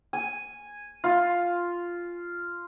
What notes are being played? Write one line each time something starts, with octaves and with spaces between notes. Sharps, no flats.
G#5
F4